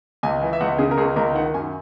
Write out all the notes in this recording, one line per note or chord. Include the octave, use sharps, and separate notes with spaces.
C#2 G#5
E3
E5
C#2 F#5
C#3 G#4
A#4
C#2 G#4
C#2 A#4
D#3 F#5
F#2 G#5